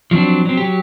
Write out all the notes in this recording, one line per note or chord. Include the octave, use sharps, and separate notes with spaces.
F3 F#3 C4 D4
F#3 C4
F#3 G4